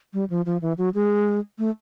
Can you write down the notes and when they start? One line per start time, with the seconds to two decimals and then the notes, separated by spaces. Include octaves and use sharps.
0.13 G3
0.30 F3
0.46 F3
0.62 E3
0.78 F#3
0.94 G#3
1.59 A3